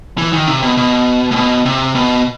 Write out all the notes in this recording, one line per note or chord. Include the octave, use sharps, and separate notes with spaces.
E3
D#3
C3
B2
B2
A2
B2
C3
B2